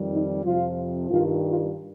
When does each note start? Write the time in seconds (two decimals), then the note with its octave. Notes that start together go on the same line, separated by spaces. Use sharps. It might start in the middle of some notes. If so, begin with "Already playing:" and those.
Already playing: F2 D#3 G3
0.10 D#4
0.43 F2 C3 F3 F4
1.10 G2 D#3 G3 F4
1.44 F4